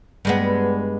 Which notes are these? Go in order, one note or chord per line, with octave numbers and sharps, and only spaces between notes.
G2 G#3 B3